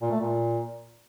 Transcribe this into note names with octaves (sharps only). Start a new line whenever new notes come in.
A#2
A3
A#2